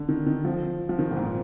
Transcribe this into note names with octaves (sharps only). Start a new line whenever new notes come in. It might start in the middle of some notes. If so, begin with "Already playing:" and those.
Already playing: D3
D#3
D#3
F3
F3
D#3
A#2
G#2